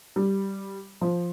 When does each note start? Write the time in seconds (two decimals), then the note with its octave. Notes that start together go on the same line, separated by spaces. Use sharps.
0.16 G3
1.01 F3